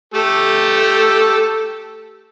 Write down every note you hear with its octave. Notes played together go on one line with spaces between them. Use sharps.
A3 G4 A4